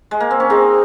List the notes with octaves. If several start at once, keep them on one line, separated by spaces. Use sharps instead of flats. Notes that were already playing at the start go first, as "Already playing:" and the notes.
G#3
A#3
C4
C#4
C4 D#4 G#4